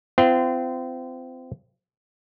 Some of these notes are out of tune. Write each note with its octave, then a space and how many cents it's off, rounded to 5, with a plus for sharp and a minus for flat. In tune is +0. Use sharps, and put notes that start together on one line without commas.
C4 -30 F4 -35